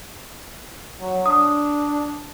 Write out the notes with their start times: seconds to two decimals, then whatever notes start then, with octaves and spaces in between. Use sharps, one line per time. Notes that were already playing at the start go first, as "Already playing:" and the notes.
0.99 F#3
1.26 D4 D#6